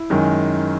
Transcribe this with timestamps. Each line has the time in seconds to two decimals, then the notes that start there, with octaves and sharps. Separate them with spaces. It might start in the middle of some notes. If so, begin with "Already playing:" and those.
Already playing: E4
0.10 F#2 D#3 G#3